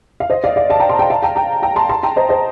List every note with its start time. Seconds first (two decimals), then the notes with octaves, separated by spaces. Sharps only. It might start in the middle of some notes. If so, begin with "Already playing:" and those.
0.20 F5
0.30 C5 D#5
0.44 D5 F5
0.56 D5 F5
0.70 F5 A5
0.80 G5 A#5
0.89 A5 C6
0.99 G5 A#5
1.10 F5 A5
1.22 G5 A#5
1.36 G5 A#5
1.62 G5 A#5
1.76 A5 C6
1.89 A5 C6
2.03 G5 A#5
2.16 C5 D#5
2.29 C5 D#5